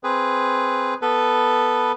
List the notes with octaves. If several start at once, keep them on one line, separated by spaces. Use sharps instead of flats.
C4 G#4 B4
B3 A4 B4